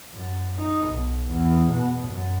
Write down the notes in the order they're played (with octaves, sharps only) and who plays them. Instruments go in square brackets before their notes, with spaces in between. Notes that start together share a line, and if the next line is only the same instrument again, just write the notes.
[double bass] F#2
D#4
B1
E2
B2
F#2